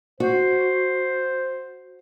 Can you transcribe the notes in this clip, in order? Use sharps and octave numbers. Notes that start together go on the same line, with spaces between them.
F#4 C5